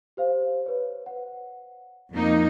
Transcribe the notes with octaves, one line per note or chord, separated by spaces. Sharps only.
G4 C5 F5
B4 C#5
F#5
F2 A#3 D#4